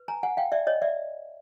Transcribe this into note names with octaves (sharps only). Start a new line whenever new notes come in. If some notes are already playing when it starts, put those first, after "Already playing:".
Already playing: B4
G#5 A#5
F#5 G#5
F5 G5
D5 E5
C#5 D#5
D5 E5